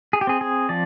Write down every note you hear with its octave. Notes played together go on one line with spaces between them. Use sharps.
G#4
G4
C4 G#4
G#4
F3 D5